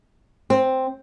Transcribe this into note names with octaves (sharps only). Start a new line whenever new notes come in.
C4